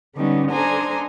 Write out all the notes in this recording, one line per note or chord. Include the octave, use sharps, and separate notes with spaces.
D3 G3 B3 C#4 D#4
D4 A4 C5 D#5 G#5 A#5